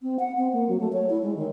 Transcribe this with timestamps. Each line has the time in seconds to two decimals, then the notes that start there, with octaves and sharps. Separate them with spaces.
0.02 C4
0.19 F#5
0.38 C4
0.53 A#3
0.69 F#3
0.80 A3
0.93 C#5
1.10 E4
1.23 G#3
1.36 D#3